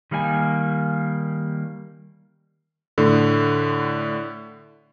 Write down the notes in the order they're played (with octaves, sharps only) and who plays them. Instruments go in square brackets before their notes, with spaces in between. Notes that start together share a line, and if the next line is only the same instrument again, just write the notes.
[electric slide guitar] D#3 G3 A#3 G#4 G#5
[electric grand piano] A2 D3